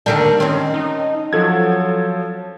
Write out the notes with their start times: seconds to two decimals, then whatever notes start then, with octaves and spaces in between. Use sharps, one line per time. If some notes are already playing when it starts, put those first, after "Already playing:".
0.06 D#2 D3 G3 A#4 A5
0.40 D#3 C4 C#4
0.74 D#4
1.33 F3 F#3 A4 G#6